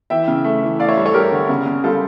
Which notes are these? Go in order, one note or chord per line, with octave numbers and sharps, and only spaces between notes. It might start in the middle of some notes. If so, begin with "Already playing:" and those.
E3 E5 G5
C#3
A3
E3
A3 D5 F5
C#5 E5
G2
A4 C#5
G2 G4 A#4
D3
C#3
C#3
G3 F4 A4